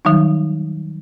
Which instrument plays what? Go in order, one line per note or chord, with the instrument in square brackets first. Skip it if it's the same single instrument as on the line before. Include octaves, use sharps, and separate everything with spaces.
[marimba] D#3 F#3 G3 D#4